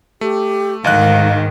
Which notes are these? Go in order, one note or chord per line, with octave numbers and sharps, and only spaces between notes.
A3 G4
D2 G#2 D#3 D#5 F5 F#6